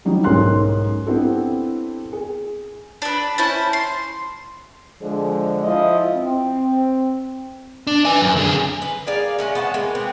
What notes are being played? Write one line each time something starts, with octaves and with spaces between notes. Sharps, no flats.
E3 F#3 G3 D#4
B1 G#2 C#4 A#4 C6 F#6
B3 C4 D4 E4 G4 A4
G#4
D4 B4
C#4 E4 C5 A5
C6
D3 F3 G#3
F3 E4 D#5
C4
D4
B4 G#5
F#2
D3 G#4
B4
A#3 G#4 D5 F5
G#3 A3 C#4
B3 C#5 E5 A5
G#3 A#3
B3 C4